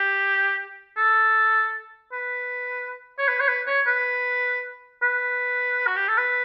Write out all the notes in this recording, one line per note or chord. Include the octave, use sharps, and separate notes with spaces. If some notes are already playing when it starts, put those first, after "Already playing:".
Already playing: G4
A4
B4
C#5
B4
C#5
B4
C#5
B4
B4
F#4
G4
A4
B4